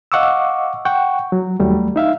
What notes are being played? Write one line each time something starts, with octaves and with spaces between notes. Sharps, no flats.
D#5 F5 F#5 C#6 D6 E6
F#5 G5 C#6
F#3
D#2 F#3 G3 A3
D#4 E5 F5